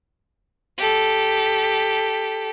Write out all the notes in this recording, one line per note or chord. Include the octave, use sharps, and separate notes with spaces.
G4 A4